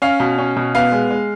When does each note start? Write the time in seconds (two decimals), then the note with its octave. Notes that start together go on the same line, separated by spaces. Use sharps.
0.02 C#4 F5
0.20 B2
0.38 C#4
0.56 B2
0.75 B3 F5
0.92 G#3
1.10 G#3